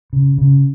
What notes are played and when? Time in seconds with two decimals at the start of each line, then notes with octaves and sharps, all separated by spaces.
0.13 C#3
0.38 C#3